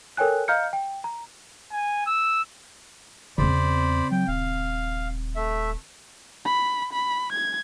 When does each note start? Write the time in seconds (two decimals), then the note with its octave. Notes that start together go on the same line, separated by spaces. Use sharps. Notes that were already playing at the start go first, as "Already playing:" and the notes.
0.17 A4 A#4 C#5 G5 G#5 F#6
0.48 D#5 F5 A#5 F6 G6 C#7
0.73 G5
1.04 A#5
1.72 G#5
2.06 E6
3.38 E2 C#3 C4 C5 D5 B5
4.11 F#3 G5
4.28 D#1 F5
5.36 A3 E5
6.45 B5
6.93 B5
7.32 G#6